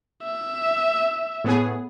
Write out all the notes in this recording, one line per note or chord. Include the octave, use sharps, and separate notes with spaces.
E5
A2 B3 G#4